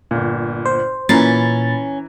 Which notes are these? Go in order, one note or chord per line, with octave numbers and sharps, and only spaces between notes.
G1 A#2
C5
A#2 E3 C#4 A#5 B5 A6 C7